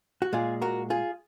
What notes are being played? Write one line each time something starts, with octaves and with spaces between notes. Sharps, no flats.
F#4
A#2 G#3 F4 G#4
F#4 A#4
F4 G#4